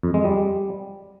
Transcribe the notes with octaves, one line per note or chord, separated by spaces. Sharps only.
F2
G#3
G3